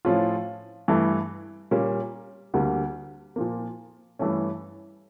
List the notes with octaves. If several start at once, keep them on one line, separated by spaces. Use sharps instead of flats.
A2 F3 C#4 F4
G2 E3 A3 E4
A#2 G3 A#3 C#4
D2 D3 G3 A#3
A#2 F3 A#3
G2 E3 A3 C#4